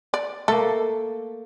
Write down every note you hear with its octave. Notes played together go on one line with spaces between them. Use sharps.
D5
A3 A#3 A4